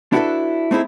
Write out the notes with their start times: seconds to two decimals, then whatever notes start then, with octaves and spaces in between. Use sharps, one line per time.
0.12 D4 E4 F#4 G4 A4 B4
0.71 A3 C4 D#4 E4 G#4